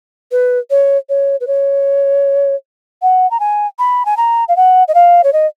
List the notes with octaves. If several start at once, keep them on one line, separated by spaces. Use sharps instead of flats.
B4
C#5
C#5
B4
C#5
F#5
A#5
G#5
B5
G#5
A#5
F5
F#5
D#5
F5
C#5
D#5